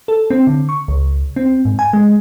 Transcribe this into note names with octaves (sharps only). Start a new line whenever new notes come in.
A4
C4
D3
C#6
C#2
C4
G#2
G#5
G#3